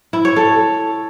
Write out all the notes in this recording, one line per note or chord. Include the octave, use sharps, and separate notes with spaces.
E4
C#5
A4